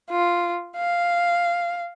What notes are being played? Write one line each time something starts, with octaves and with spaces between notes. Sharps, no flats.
F4
F5